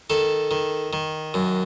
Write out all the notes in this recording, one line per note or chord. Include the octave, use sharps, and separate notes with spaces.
D#3 A4
D#3
D#3
F#2